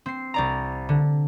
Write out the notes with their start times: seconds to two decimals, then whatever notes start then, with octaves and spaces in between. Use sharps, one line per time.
0.06 C4 C7
0.34 C2 D5 A#5
0.89 D3